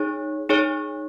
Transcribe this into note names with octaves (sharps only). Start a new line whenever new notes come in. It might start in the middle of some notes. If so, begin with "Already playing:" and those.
Already playing: D#4 G#4 C#5
D#4 G#4 C#5